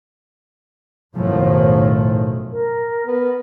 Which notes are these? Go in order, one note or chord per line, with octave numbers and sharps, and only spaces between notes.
B1 F#2 A2 D#3 F3
A#4
B3